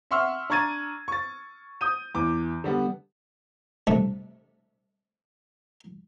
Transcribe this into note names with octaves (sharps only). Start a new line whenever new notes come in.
E5 F#5 C6 C#6 E6 F6
D4 A#5 C#6 G#6 A6 D#7
C#6 A6
D#6 G6 D#7
E2 D6
D3 G3 B3
G2 C3 A3